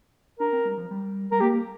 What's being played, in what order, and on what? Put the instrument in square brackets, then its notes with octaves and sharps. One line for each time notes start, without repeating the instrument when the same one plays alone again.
[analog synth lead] D4 [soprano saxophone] A#4
[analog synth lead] C4
G3
F3
G3
[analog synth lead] G3 [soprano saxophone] A#4
[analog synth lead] A#3 [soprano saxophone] G4